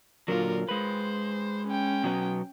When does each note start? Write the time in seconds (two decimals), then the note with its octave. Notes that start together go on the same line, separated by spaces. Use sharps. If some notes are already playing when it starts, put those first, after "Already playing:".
0.28 A#2 D3 F#3 F4 A#4
0.69 G#3 B4 C5
1.67 C#4 G5
2.04 B2 F#3 B3